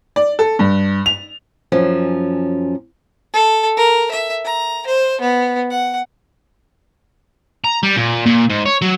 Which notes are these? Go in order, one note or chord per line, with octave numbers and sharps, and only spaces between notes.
D5
A4
G2
F7
F#2 F3 C#4
A4
A#4
E5
A#5
C5
B3
F#5
A#5
G3
A#2
A#2
G#2
C#5
F#3